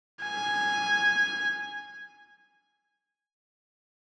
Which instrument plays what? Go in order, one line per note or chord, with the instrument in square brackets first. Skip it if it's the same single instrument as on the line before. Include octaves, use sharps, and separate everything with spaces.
[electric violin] G#5